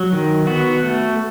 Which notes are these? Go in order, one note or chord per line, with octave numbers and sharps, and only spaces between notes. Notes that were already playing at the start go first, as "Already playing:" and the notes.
Already playing: F#3
D#3
B3 F#4
A3